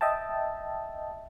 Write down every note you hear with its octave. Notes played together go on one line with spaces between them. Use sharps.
D#5 E5 G5 A5